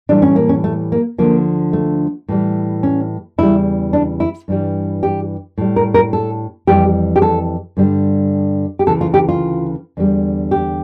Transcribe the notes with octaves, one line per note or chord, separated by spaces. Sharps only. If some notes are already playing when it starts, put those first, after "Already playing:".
A2 E3 G3 D4
C#4
A#3
C#4
A3
A#3
D2 D3 F3 A#3
A3
A2 E3 G3
C#4
E2 C#3 E3 G3 E4
D4
E4
G2 E3 G3
G4
A2 G3
A#4
A#4
A4
F2 E3 G3 G4
G4
A4
G2 D3 G3
G4
D2 C#3 E3 A4
F4
G4
F4
E2 D3 G3
G4